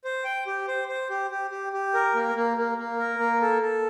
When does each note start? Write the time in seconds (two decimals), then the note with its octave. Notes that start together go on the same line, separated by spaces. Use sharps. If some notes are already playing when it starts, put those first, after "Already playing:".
0.04 C5
0.24 G5
0.47 G4
0.68 C5
0.88 C5
1.09 G4
1.31 G4
1.51 G4
1.73 G4
1.94 A#4
2.14 A#3
2.35 A#3
2.57 A#3
2.78 A#3
2.99 A#4
3.19 A#3
3.41 A4
3.62 A4